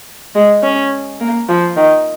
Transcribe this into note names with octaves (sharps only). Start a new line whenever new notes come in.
G#3
C#4
A#3
F3
D#3